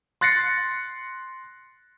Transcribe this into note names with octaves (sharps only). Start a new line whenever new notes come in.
C6 F#6 A6 A#6 C7 C#7